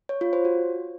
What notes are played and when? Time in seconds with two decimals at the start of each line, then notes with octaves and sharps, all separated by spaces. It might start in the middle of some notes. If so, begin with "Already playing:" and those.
0.09 C#5
0.21 F4
0.33 C5
0.45 F#4